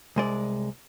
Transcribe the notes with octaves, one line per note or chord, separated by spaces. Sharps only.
C2 G#3 D5